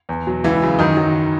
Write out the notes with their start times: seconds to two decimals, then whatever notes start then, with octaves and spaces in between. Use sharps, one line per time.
0.09 E2
0.27 B2 F#3
0.44 C#2 E3 E4
0.62 C#3 F#3
0.79 F#2 D#3 D#4
0.96 D#3 F#3